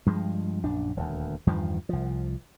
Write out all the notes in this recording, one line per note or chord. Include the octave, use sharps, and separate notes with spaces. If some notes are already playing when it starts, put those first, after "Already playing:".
G2 F3 G#3
A#1 F#2 D4
D#1 D2
E2 G2 D#3 F3
C2 F3